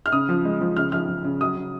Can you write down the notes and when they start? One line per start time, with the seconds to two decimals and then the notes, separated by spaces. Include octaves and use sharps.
0.06 F6
0.12 C#3 D#6
0.29 F3
0.45 G#3
0.61 F3
0.77 C#3 F6
0.92 F3 F6
1.09 F3
1.24 C#3
1.41 F#3 D#6
1.57 C#3